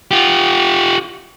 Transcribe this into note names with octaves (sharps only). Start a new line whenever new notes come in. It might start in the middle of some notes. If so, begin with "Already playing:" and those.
F4 G4